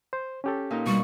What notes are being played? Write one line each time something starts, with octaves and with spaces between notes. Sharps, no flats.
C5
C#4 G4 A4
A#2 D#4
B2 G3 C#6